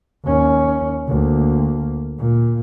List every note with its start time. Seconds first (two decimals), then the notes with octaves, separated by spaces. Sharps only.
0.25 D#2 C#4
1.08 D2 A#3
2.18 A#2